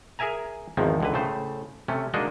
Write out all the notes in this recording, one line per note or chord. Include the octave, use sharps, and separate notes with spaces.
G#4 A#4 E5 G#5 A#5
G#1 E2 D#3 F3 G#3
C#2 D3 B4
A2 C#3 A3 C5
C3 A3 C#4
G#3 A#3 D4 D#4 F#4 D#5